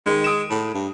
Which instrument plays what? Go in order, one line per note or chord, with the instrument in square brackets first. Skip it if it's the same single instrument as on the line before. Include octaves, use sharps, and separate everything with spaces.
[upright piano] D#3 [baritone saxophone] G#3
[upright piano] D#6 D7 E7
[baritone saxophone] A2
G2